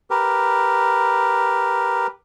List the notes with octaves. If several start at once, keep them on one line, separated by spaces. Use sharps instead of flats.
G4 A#4 B4